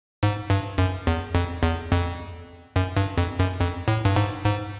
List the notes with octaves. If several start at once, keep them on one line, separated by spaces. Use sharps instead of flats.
G#2
G2
F#2
E2
F2
E2
F2
F#2
G2
F2
F#2
F2
A2
G2
G#2
G#2